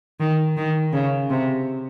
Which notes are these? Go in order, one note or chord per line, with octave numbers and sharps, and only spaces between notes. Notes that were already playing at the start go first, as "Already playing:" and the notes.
D#3
D#3
C#3
C3